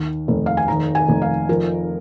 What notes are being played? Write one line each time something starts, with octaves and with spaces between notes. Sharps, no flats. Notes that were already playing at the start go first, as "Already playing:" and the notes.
Already playing: D#2 D#3
F1
F5
G#5
D#3 A#5
G#5
F1
F5
F3 A#4